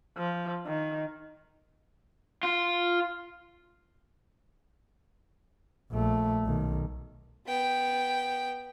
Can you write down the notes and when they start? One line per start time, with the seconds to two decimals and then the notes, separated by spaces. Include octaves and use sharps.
0.17 F3
0.66 D#3
2.43 F4
5.92 A#1 A3
6.45 B1 D#3
7.47 B3 G5